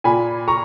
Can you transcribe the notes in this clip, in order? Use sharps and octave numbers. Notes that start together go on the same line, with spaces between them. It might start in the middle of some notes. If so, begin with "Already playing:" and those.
A#2 G#5 B5
A#5 C#6